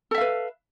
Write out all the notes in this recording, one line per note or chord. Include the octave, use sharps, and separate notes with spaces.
A4 B4 E5 F5